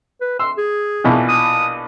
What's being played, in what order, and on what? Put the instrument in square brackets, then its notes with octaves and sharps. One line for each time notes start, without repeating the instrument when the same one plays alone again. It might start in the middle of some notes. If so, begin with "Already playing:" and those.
[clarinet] B4
[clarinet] C6 [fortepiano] E6
[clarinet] G#4
[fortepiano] A#1 B2 E3
[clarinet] D#6